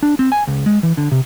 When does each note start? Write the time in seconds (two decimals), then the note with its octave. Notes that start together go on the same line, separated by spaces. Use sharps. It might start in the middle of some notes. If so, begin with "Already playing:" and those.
0.03 D4
0.19 C4
0.32 G#5
0.47 C#2
0.66 G#3
0.83 E3
0.97 D3
1.12 C3